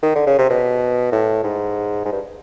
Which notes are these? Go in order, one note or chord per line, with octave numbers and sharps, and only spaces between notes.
D#3
D3
C#3
C3
B2
A2
G#2
G#2
G2